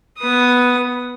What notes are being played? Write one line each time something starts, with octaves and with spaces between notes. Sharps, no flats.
B3 D#6